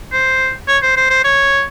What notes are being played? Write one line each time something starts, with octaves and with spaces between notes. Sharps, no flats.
C5
C#5
C5
C5
C5
C#5